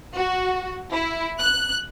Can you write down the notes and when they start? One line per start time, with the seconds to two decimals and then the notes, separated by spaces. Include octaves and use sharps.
0.15 F#4
0.89 E4
1.38 F#6